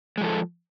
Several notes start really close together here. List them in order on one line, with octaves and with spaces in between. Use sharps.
G#3 F3 A4